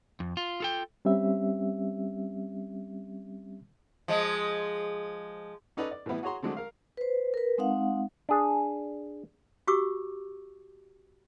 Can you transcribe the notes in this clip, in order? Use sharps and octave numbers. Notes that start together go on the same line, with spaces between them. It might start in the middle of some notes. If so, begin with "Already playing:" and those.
F2
F4
F4 A4 G5
G3 C4 C#4 G4 E5
F3 G#3
C#4 D#4 A4 B4 D5
D5
A2 E3 G3 B3 E4
F#4 G#4 C#5 A#5 C6
D3 F#3 G#3 A3 C4
A#4 F5
B4 C5
A#4 B4
G#3 C4 D#4 F5 F#5
D4 G#4
F#4 G4 C#6 D6 E6